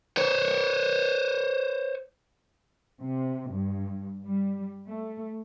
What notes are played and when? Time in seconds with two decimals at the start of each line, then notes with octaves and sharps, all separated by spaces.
0.17 C5 C#5
3.03 C3
3.51 G2
4.26 G3
4.87 A3